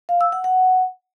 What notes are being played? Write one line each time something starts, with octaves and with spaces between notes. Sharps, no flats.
F5
E6
F#5
F#5